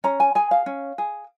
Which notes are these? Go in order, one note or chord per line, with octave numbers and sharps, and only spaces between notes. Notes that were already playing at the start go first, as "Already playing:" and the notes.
C#4 A#5
G#5
G#4 G#5
F5
C#4
G#4